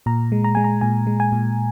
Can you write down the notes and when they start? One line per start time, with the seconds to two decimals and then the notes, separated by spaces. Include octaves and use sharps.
0.06 A#2 A#5
0.32 G#3
0.44 A#5
0.55 G#3 G#5
0.64 A#5
0.81 A#2 G#5
1.07 G#3
1.20 G#5
1.32 A#2